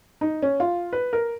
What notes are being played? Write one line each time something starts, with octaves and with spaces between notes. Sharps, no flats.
D#4
C#4
F4
B4
A#4